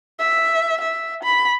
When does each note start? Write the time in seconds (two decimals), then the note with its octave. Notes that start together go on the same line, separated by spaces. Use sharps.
0.20 E5
0.81 E5
1.23 B5